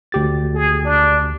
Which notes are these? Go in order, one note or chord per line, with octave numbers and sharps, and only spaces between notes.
D2 G4 A6
G#4
D4